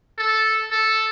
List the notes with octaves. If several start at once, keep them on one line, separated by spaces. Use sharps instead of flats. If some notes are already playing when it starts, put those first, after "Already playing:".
A4
A4